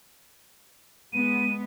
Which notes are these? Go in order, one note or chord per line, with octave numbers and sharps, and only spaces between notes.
G#3 B3 D#7